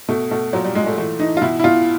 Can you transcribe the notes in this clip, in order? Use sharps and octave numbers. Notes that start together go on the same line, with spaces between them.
B2 A3
B2 A3
A#2 F#3
G3
A#2 G#3
A3
E3 A3
E3 D#4
F4
B2 E4
E4
B2 F4